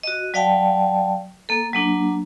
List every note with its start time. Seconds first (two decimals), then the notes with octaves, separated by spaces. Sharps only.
0.03 F#4 D#5
0.34 F#3 D5 F5 G5 A5
1.49 A#3 A4
1.73 F#3 A#3 D4